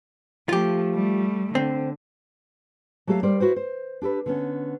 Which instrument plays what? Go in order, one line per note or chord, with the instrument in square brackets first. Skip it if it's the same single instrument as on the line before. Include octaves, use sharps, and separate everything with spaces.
[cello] F3 A3 [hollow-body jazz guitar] F4 G4
[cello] G3 A3
[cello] D3 [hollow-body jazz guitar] C4
[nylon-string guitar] F#3 A3 G4 A4 F5
G3 A#4 C5 D5
E4 F#4 B4 C5
C5
D4 G4 A4 B4
D3 B3 C#4